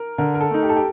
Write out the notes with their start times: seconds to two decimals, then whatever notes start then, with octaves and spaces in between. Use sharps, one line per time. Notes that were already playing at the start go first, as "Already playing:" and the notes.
Already playing: A#4
0.18 D3 A#4
0.34 A#4
0.41 A4
0.51 A3 D#4
0.63 G4
0.69 A4
0.76 G4